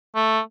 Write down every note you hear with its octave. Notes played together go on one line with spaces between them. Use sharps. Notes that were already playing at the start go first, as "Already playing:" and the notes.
A3